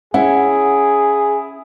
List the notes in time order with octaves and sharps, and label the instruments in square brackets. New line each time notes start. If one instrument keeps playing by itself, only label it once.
[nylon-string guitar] C#4 [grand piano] E4 [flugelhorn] G#4 [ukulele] F#5